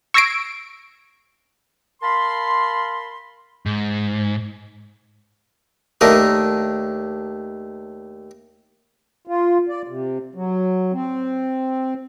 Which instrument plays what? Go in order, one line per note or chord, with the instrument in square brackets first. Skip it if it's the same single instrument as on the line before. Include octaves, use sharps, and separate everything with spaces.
[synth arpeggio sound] C#6 E6 G#6 A#6 C7 D7
[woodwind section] A#4 F5 A5 B5 C6
[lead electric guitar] G#2
[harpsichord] D#2 A3 D4 A#4 D#6
[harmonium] F4
D5
C3
F#3
C4